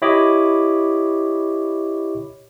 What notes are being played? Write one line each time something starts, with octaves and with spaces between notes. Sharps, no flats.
E4 G4 C#5 D#5 B5 D6